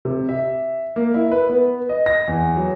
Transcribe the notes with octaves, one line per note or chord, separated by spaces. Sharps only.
C3
E5
A#3
E4
B4
B3
D#5
A#6
E2
F#3